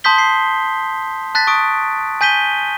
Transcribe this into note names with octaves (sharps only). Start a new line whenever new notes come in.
A5 C6 D#6 G6 B6 G7
C7
A5 F#6 A6 B6
C#6 D#6 D7
G#5 G6 B6 D#7 G7